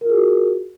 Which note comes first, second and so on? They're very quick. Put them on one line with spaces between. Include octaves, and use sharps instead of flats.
A#4 F4 G#4 F#4